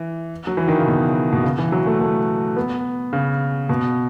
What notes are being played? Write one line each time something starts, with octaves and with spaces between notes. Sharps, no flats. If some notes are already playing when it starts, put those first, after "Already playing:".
Already playing: E3
F#3
E3
D#3
C#3
B2
B2
C#3
E3
F#3
A3
A3
B3
C#3
B2